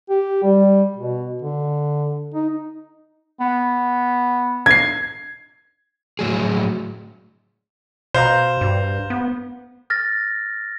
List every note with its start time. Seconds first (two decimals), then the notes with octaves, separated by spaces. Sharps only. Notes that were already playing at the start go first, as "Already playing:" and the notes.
0.09 G4
0.43 G3
0.97 B2
1.42 D3
2.34 D#4
3.40 B3
4.66 G#6 C7
6.19 A2 F#3 G#4
8.14 B2 C5 F5 A#5
8.61 G2
9.10 B3
9.90 F6 A6 A#6